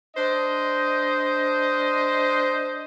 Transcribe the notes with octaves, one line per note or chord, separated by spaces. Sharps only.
D4 C5 D#5